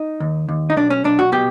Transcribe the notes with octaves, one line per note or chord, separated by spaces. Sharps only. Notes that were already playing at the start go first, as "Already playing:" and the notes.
Already playing: D#4
D#2
D#2
D#4
B1 D4
C#4
B1 D4
F#4
B2 G4